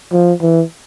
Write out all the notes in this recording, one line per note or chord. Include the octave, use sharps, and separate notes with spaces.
F3
E3